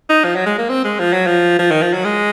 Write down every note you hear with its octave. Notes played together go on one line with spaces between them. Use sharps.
D#4
F3
F#3
G#3
A#3
C4
G#3
F3
F#3
F3
F3
D#3
F3
F#3
G#3